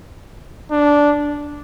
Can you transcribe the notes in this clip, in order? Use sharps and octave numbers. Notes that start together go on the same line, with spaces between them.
D4